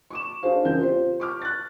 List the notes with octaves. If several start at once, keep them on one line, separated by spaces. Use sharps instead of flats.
C#6 D6 E7
D4 F#4 G#4 C5 F5
F2 C#3 E3 A#4 G6
F4 G4 C5
C#6 D6 F6
F#6 A6